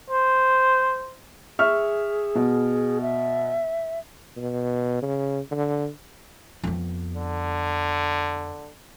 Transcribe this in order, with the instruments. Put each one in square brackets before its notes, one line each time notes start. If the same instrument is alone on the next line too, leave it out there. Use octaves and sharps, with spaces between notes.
[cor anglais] C5
[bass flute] G#4 [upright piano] E5 C#6 F6
[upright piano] B2
[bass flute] E5
[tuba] B2
C#3
D3
[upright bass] F2 B3
[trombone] D3